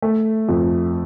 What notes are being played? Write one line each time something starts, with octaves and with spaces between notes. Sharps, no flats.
A3
F2